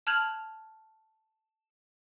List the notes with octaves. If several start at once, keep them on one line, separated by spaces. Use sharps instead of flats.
A5 F6 F#6 G#6 F7 F#7